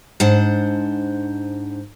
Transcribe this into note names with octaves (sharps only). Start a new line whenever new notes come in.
G#2 D4 C5 F#5